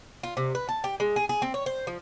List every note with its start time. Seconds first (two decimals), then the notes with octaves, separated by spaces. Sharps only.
0.23 F4
0.37 C3
0.55 B4
0.69 A5
0.84 G4
1.00 G#3
1.16 G#4
1.29 G#4
1.42 C4
1.54 C#5
1.66 C5
1.87 F3